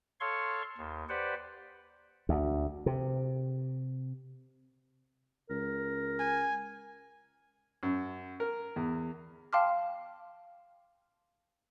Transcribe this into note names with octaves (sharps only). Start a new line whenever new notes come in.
A4 C#5 F5 C6 C#6
D#2
G4 B4 C5 D5 F#5
D2
C3
C#2 A#4
G#5
F#2
A#4
E2
F5 G5 A5 C6 D6 F6